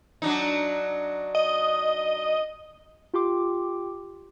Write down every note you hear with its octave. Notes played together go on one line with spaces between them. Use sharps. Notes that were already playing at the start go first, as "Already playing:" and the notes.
F#3 D4 D#4
D#5
F4 G4 G5 C6 D6